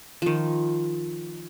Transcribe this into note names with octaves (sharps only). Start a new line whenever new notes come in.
D#3 F3